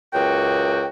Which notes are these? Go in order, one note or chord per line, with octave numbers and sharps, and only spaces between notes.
C#2 F#2 F#4 G5